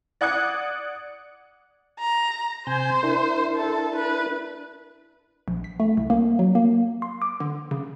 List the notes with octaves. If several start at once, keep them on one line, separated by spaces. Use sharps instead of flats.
D5 F#5 D#6 F#6 G#6 C#7
A#5
C3 C5 G#5 G6
D4 E4 A#4
A4
B4
A#1
B6
A3
C2
A#3
F#3
A#3
C6
D6
D3
C#3